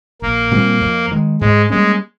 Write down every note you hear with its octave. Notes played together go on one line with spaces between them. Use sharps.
A#1 A#3
A#2 G3 C4
F2
D#3 G#3
G#2 G#3
G3 G#3 A#3 C#4